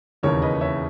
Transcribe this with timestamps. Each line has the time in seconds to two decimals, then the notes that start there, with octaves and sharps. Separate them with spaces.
0.23 E1 D#2 C#3 E3 A#4 C#5
0.42 B4 D#5
0.61 C#5 E5